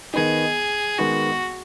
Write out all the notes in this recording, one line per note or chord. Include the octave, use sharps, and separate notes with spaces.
D#3 B3 D#4 G#4
D#3 G#3 B3 D#4 F#4